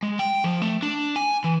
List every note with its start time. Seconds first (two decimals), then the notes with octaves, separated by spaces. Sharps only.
0.03 G#3
0.19 G5
0.44 F3
0.62 A3
0.82 D4
1.16 G#5
1.44 E3